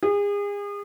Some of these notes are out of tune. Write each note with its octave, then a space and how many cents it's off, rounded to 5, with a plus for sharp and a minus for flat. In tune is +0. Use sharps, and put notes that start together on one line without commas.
G#4 -35